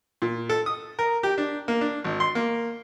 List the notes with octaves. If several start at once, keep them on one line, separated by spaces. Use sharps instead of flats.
A#2
A4
D#6
A#4
G4
D4
A#3
D4
G#1
C6
A#3